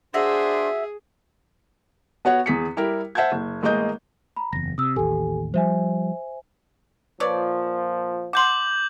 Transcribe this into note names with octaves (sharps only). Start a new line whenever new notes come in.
D4 F#4 G#4 C5 E5 C6
B3 F#4 C#5 F#5
E2 G#4 B6 C#7
G3 E4 G4 A#4
C5 E5 F#5 A5 G6 G#6
F#1
A1 G#3 A#3 D#5 G6
A#5 B5
F#1 E2 A#6
C3 D#6 E6
A1 D#2 G4 A4 G#5
F3 G3 C5 E5 G#5
A#2 F3 B4 C#5 D5
F#5 C6 D6 G6 F#7